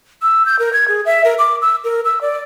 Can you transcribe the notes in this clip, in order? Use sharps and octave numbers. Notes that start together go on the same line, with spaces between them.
E6
G6
A#4
G#6
G#4
E5
A#4
D6
E6
A#4
E6
D5